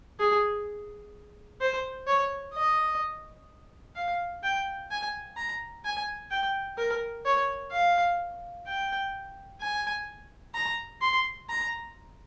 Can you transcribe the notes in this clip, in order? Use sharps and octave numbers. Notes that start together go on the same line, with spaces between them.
G#4
C5
C#5
D#5
F5
G5
G#5
A#5
G#5
G5
A#4
C#5
F5
G5
G#5
A#5
C6
A#5